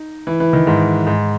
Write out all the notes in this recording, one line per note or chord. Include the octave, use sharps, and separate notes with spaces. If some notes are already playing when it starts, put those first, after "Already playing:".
Already playing: D#4
E3
E3
D#3
G#2
G#2